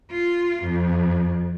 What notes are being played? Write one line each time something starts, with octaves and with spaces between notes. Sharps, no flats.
F4
F2